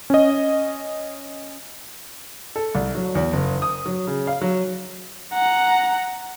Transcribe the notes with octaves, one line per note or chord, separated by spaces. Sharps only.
C#4 D#5
A4
C2
F#3
E2
F#1
D#6
F#3
C#3
F5
F#3
F#5 A#5